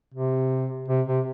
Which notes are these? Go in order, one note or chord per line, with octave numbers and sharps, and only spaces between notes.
C3
C3
C3